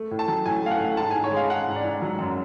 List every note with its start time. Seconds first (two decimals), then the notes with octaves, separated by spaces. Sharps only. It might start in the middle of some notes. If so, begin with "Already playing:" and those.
Already playing: A3
0.11 A2
0.19 A5
0.28 F#3
0.46 A2 G#5
0.63 A3 F5
0.71 F#5
0.80 A2
0.97 G#2 A5
1.11 G#5
1.15 G#2
1.24 C#5
1.32 G#3 F5
1.49 G#3 F#5
1.68 G#2
1.76 D5
1.85 G#2
2.02 F#3
2.19 F#2